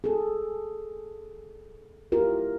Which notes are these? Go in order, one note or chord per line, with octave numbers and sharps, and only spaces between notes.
G#4 A4
E4 F4 G4 A#4